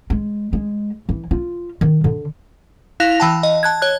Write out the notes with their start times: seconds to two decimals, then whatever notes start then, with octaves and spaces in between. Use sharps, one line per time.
0.10 G#3
0.53 G#3
1.09 E3
1.31 F4
1.81 D#3
2.04 D3
3.00 E4 F5 F#6 A#6 F7
3.20 E3 G5 A5
3.43 D#5
3.63 A5 F#6 G#6
3.82 C#5 F#6